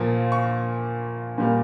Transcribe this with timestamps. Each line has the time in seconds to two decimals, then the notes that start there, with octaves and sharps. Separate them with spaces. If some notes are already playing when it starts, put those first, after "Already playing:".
Already playing: A#2 F3 A#3
0.32 C#6
1.38 A#2 G3 A#3